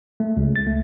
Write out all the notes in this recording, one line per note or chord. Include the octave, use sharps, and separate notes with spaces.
A3
C#2
A6
A3